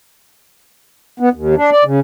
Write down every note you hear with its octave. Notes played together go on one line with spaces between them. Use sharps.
B3
D#2
D4
D5
C#3